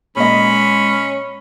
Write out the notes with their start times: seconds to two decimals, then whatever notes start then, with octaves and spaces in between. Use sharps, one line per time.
0.16 A#2 G#3 C#4 D#5 B5